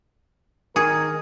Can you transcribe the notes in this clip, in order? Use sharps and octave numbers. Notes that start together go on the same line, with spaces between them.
D#3 G#4 A#4